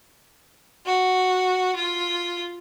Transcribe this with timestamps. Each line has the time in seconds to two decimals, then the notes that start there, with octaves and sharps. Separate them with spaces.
0.86 F#4
1.76 F4